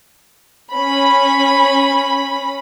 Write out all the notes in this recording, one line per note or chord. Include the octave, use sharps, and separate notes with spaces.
C#4 B5